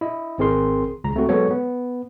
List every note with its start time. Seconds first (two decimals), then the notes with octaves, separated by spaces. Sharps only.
0.01 E4 D#5
0.38 G#1 C4 G#4 A#4 C6
1.04 C#2 A#5
1.16 A3 C4 F#4
1.29 F#3 G#3 B3 A4 C#5
1.51 B3